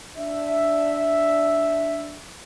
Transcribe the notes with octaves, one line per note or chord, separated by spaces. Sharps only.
D4 E5